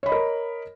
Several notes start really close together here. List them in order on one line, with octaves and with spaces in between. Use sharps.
C#5 B5 D#5 A#4